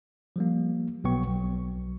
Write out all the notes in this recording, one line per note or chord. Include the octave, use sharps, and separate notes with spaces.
F3 G3 A#3
B1 B2 F#3 B3 G5 C#6
B1 F#3